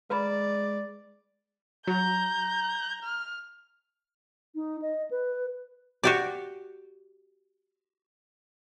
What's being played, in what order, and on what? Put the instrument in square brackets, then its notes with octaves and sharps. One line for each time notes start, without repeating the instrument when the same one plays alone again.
[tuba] G#3 [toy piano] B4 A#5 B5 [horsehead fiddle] D5
[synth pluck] F#3 [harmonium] A#5 [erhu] G6
[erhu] F6
[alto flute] D#4
D#5
B4
[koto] F#4 G4 D5